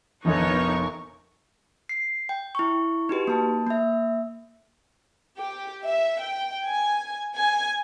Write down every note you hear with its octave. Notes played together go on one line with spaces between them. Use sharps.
F1 A#1 B3 D#4 A4 A#4 C#5 C#6
C7
G5
E4 C#6
D#4 F#4 G4 B4
A#3 A5
A#3 E5
G4
E5
G5
G#5
G#5